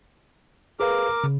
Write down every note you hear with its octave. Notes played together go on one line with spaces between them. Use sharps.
G#4 A#4 B4 F5 D6
C#3